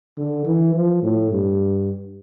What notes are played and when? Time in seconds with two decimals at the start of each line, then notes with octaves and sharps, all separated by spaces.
0.18 D3
0.46 E3
0.74 F3
1.03 A2
1.31 G2